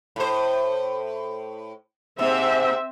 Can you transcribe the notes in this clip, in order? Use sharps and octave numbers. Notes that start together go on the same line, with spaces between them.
A2 C5
G#2 C3 C4 E5